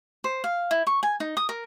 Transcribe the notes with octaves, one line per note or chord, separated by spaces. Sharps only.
C5
F5
E4
C#6
G#5
D#4
D#6
A#4